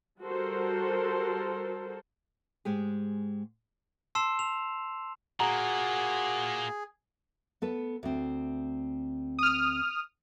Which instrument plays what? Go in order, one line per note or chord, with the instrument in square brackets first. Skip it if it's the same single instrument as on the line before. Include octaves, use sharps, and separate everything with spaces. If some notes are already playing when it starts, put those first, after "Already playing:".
[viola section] G3 F#4 A4 A#4 C5
[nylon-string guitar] G#2 G#3 G4 G#4
[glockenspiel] A5 C6 E6 C7 E7
F7
[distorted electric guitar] A#2 A#3 [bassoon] F#4 [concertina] G#4 [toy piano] A#5
[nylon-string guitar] B3 A4 B4
D2 C4
[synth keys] D#6 F6